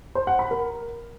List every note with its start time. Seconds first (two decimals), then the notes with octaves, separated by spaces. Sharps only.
0.15 C5
0.27 F#5
0.39 B5
0.51 A#4